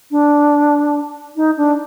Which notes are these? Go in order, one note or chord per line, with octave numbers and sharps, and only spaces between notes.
D4
D#4
D4